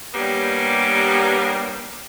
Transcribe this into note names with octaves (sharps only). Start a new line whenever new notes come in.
G3 A#3 B3 C#4 D4 G4